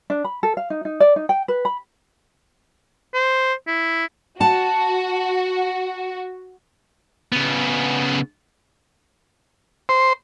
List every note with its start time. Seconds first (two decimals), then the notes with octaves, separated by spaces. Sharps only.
0.10 D4
0.24 B5
0.43 A4
0.57 F5
0.70 D#4
0.85 D#4
1.00 D5
1.16 D#4
1.29 G5
1.48 B4
1.65 B5
3.14 C5
3.67 E4
4.40 F#4 F#5 A5
7.32 C#3 B3
9.89 C5